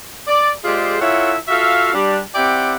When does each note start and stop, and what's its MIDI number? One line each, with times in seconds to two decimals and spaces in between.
0.28 0.50 74
0.64 1.00 56
0.64 1.00 65
0.64 1.00 67
0.64 1.00 68
0.64 1.00 72
0.64 1.00 74
1.00 1.34 64
1.00 1.34 65
1.00 1.34 69
1.00 1.34 73
1.00 1.34 76
1.00 1.34 78
1.48 1.91 65
1.48 1.91 66
1.48 1.91 69
1.48 1.91 76
1.48 1.91 77
1.93 2.19 55
1.93 2.19 62
2.35 2.75 60
2.35 2.75 64
2.35 2.75 67
2.35 2.75 74
2.35 2.75 78
2.35 2.75 79